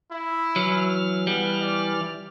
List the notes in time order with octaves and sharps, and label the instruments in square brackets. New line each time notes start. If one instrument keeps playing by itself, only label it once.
[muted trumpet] E4
[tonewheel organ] E3 F6 [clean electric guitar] F#3
[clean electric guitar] G3 [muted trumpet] B3
[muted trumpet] D5